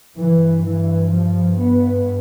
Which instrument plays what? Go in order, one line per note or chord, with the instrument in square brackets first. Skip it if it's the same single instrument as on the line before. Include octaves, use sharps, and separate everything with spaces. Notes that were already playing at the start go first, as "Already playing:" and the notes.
[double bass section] G2 E3
E3
F3
B3